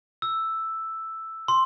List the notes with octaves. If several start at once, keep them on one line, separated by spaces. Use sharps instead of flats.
E6
C6